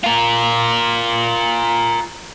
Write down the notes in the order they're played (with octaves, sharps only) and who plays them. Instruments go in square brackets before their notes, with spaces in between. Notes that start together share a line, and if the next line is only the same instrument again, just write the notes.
[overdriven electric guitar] F4 A#4